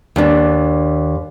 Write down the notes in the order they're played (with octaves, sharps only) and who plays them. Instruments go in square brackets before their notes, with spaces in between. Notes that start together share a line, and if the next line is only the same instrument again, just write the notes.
[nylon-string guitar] D#2 D4